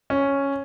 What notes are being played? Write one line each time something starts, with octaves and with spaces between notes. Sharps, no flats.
C#4